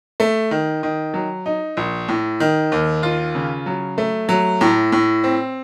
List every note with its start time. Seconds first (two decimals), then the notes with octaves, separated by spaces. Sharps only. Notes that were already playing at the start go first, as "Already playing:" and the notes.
0.20 A3
0.51 D#3
0.83 D#3
1.14 F#3
1.46 D#4
1.77 A#1
2.08 A2
2.40 D#3
2.72 D#2
3.03 F4
3.35 C#3
3.66 F#3
3.98 A3
4.29 F#3
4.61 A2
4.92 A2
5.24 C4